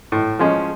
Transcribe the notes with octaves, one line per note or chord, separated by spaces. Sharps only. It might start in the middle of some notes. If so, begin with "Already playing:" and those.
A2
F3 G#3 C#4